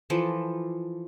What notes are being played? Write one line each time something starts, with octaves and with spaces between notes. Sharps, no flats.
E3 F3 A4